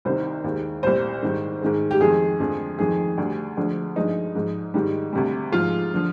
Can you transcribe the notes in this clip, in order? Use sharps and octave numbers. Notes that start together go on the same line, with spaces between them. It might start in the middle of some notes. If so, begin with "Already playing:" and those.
C2 C3 D#3 C5
D#2 D#3 G#3
C2 A#2 G3 C5
G#2 D#3 G3
G#2 D#3 G#3
G4
F2 D#3 G#3 G#4
F2 D3 F3 G#3
F2 D#3 G#3 G#4
D2 D3 G3
D2 D3 F3 G#3
G2 F3 G#3 D#4
G#2 F3 G#3
G#2 D#3 G3
D2 C3 G3
G#2 F3 G#3 F4
D3 F3